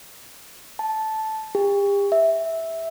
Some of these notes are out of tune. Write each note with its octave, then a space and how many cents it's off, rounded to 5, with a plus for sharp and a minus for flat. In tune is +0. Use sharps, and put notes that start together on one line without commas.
A5 -10
G4 +40
E5 -10